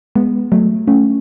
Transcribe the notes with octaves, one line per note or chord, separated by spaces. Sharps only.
G#3 B3
F#3 A3
A3 C#4